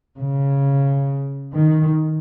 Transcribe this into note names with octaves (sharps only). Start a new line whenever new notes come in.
C#3
D#3